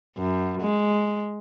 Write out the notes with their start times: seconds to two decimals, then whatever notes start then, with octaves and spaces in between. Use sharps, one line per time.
0.17 F#2
0.61 G#3